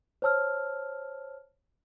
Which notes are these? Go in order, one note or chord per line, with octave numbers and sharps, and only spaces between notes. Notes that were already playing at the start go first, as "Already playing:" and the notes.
C5 C#5 A5 E6 F6